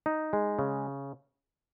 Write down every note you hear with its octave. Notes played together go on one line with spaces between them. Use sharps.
D#4
G#3
C#3